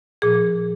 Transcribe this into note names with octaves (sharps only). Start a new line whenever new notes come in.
A#2 F3 G#4